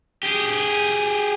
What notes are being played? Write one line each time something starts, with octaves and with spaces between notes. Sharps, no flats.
G4 G#4